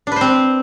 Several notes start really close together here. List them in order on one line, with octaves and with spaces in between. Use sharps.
D4 B4 C5 C4